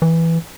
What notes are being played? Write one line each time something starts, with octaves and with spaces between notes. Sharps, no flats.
E3